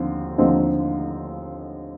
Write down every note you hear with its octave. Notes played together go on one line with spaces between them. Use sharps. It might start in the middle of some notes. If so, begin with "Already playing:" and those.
Already playing: D#2 D3 F3 C4
D#2 D3 F3 C4 D#4